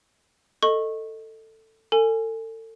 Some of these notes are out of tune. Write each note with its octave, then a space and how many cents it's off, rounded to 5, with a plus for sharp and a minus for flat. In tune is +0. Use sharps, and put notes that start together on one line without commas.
A4 +15 D#5 +0 C#6 -20
A4 +35 G#5 +0